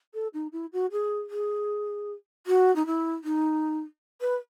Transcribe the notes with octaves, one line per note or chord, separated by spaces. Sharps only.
A4
D#4
E4
F#4
G#4
G#4
F#4
D#4
E4
D#4
B4